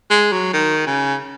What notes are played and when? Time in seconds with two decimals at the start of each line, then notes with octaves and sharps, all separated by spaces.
0.10 G#3
0.32 F#3
0.53 D#3
0.86 C#3